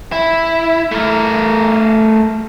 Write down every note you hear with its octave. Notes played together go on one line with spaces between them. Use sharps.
E4
A3 A#4